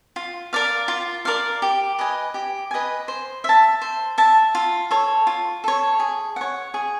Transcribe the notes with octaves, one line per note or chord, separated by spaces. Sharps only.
F4
A#4 D5 F5
F4
A#4 D5 F5
G4
B4 D#5 G#5
G4
B4 D#5 G#5
C5
E5 A5
C5
E5 A5
F4
A4 C#5
F4
A4 C#5
G#4
C#5 F#5
G#4